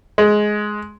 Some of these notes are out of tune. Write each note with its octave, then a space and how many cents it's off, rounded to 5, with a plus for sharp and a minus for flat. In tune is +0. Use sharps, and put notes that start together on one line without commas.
G#3 +10